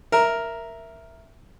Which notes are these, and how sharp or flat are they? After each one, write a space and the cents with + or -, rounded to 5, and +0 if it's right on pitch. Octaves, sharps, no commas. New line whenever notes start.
A#4 +0 E5 +5